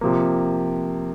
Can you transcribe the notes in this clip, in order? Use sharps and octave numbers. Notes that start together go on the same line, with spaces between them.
C3 F3 A#3